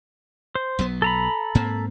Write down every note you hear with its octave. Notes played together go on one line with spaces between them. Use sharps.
C5
B1 F#3 B3
A4 A#5 B5
G#2 A#3 C4